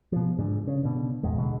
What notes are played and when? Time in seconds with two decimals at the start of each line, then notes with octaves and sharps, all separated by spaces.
0.12 B2 F3
0.39 G#2 D3
0.67 C#3
0.83 B2 D3
1.23 G#1 E2 A#2 G#3
1.38 B2 D3 E3 G#3